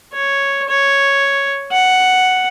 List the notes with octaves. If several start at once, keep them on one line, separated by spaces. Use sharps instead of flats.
C#5
C#5
F#5